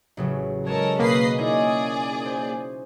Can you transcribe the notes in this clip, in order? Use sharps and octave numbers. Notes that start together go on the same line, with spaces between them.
A1 C#3 F#3
G#3 A4 A#4 C#5 A5 G#6
B2 A#3 B4 D#5 C7
C#4 D#4 E4 G#4 D5
C5 G#5